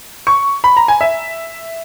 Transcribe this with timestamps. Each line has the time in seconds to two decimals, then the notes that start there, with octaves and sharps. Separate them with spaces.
0.27 C#6
0.64 B5
0.77 A#5
0.88 G#5
1.01 E5